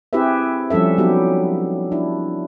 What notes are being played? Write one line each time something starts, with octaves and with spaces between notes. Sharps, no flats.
C4 E4 G4 G#4 B4 E5
F3 G3 C#4 A4 E5
F#3 B3 D#4 G4
D4 E4